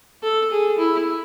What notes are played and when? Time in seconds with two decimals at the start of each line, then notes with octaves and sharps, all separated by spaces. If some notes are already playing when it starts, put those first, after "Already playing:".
0.23 A4
0.51 G#4
0.78 E4